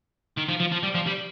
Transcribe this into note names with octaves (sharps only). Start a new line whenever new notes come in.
D#3
F3
F3
F3
G3
F3
G3